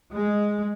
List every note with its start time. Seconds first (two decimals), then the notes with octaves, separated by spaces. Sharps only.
0.14 G#3